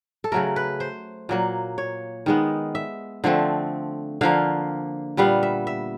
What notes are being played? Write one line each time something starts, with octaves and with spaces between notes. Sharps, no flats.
A4
C#3 F#3 A3 A#4
B4
C5
A#2 F#3 A#3
C#5
D#3 G#3 B3
E5
D3 F3 A3 C4
D3 F3 A#3 F5
A#2 G3 B3 F5
E5
E5